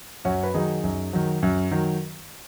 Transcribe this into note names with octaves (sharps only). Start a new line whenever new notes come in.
F#2 C#4 F#4
B4
D#3 F#3 D#4 G#4
F#2
D#3 F#3
F#2
D#3 F#3